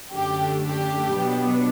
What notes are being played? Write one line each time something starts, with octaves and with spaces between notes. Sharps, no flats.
F#2 D3 A3 D4 G4
G4
B2 F#3 B3 D4